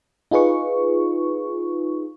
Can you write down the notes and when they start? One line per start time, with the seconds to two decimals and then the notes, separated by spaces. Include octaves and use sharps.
0.31 D#4 F4 G#4 B4 C#6